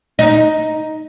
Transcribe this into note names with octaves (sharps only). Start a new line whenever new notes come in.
D#4